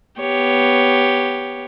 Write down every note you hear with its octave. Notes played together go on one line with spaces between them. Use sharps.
B3 G4 C#5